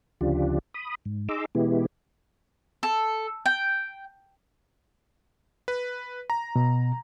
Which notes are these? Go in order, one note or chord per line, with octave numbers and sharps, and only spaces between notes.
D2 C#3 F3 D4 F4 G4
B5 D#6
G#2
D#4 G#4 A#5 C6 D6 E6
B2 E3 G#3 B3 E4 G4
A4
G5
B4
A#5
B2